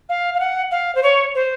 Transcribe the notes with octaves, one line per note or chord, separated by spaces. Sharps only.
F5
F5
F#5
F5
C5
C#5
C5